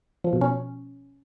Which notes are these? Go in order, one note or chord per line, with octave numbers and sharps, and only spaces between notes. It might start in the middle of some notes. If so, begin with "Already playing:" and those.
F3
B2
C#4